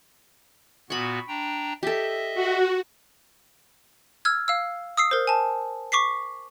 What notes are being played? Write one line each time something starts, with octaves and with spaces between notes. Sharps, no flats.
A#2 B3 F#4 B5 C#6
D4 G5 A#5
G4 A4 D#5 E5
F#4
E6 F6 G#6
F5 E6
D#6 E6 C7
A#4 C5
G#5 A5
C#6 D6 B6 C7